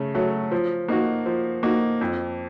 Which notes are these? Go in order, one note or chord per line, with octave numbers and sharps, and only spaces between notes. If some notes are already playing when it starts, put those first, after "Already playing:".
Already playing: C#3 A3
F#3 A3
F3
A#3 D#4 F#4
F3
A#3 D#4 F#4
F2